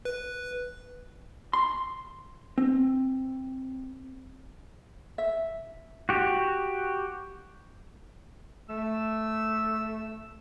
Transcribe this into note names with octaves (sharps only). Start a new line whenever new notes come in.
B4
C6
C4
E5
F#4 G4
A3 E6